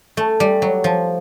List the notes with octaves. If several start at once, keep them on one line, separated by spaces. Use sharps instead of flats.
A3
G3
F#3
F3